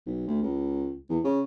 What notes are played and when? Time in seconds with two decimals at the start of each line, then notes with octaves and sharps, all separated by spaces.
0.07 B1
0.27 D2
0.43 C#2
1.09 E2
1.24 C#3